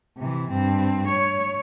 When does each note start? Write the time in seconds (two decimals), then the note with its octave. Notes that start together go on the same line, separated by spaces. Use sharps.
0.17 C3 E3
0.50 G2 C4
1.08 C#5